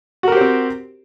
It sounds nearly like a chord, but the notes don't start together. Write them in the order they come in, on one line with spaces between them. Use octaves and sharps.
F#4 A#4 G4 C5 C4